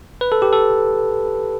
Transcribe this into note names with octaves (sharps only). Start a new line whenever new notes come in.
B4
A4
G4
A4